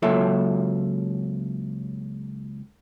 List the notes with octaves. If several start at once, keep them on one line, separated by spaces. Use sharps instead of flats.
C#2 F#3 A#3 F4 A4 E5